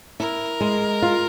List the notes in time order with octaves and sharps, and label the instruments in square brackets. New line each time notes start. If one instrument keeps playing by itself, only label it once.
[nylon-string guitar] E4 [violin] A#4
[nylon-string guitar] G#3
F4